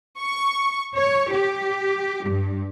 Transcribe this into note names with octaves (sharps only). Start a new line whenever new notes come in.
C#6
C#5
G4
G2